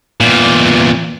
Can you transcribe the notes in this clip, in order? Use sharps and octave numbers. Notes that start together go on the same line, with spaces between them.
E2 A#2